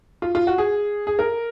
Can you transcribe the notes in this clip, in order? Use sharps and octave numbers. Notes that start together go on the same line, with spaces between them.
F4
F4
F#4
G#4
G#4
A#4